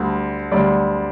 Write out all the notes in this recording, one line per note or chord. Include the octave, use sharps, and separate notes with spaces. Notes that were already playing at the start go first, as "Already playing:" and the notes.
Already playing: D2 D3 G3
D2 D3 G3 D5